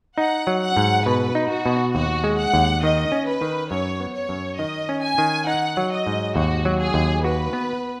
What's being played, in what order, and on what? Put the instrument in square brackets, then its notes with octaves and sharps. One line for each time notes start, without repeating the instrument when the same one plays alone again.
[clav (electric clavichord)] D#4 [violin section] F#5
[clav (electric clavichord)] F#3
[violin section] F#5
[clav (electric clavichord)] G#2
[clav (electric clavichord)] B2 [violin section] B4
[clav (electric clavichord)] D#4
[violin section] F#4
[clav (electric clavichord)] B2
[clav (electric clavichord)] D#2 [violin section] F#4
[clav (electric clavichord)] G#3
[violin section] F#5
[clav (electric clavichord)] D#2
[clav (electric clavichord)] D#3 [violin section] D#5
[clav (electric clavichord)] C#4
[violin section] B4
[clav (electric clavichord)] D#3
[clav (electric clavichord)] F#2 [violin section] C#5
[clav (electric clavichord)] B3
[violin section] C#5
[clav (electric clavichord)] F#2
[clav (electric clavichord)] D#3 [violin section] D#5
[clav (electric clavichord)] C#4
[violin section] G#5
[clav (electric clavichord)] D#3
[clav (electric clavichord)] D#4 [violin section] F#5
[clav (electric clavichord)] F#3
[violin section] D#5
[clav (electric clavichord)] G#2
[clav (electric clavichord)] D#2 [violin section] F#4
[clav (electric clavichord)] F#3
[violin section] G#4
[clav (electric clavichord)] D#2
[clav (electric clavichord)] F#4 [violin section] B4
[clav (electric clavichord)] B3